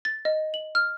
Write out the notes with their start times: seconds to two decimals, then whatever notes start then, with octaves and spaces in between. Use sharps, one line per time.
0.05 A6
0.25 D#5
0.54 F#7
0.75 F6